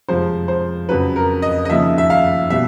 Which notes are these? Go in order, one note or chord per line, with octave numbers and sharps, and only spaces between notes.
F2 C3 F3 G#3 C5
C5
F2 C#3 F#3 B4
A#4
D#5
D#5
D#2 C#3 F3 E5
E5
F5
B2 G3 E5